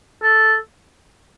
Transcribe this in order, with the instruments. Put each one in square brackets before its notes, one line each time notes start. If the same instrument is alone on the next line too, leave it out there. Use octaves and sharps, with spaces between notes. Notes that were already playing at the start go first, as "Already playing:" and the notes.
[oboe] A4